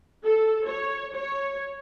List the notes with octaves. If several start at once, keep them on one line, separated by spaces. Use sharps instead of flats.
A4
C#5
C#5